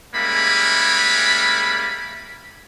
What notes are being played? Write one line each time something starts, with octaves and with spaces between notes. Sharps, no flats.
G3 G#3 A#3 C#4 E5 B5